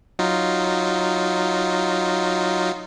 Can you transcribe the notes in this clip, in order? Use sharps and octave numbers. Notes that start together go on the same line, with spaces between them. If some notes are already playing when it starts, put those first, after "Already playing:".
F#3 D#4 F4